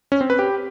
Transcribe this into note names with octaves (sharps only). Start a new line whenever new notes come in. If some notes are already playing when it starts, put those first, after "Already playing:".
C#4
C4
B4
G4